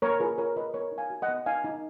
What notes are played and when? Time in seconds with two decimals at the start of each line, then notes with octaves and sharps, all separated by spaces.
0.02 A#3 A#4 C#5
0.20 F4 G#4 B4
0.38 F4 A#4 C#5
0.56 F4 B4 D#5
0.74 B3 A#4 C#5
0.92 D#4
0.98 F5 G#5
1.10 F#4
1.22 D#5 F#5
1.28 B3
1.46 D#4 F5 G#5
1.64 D#4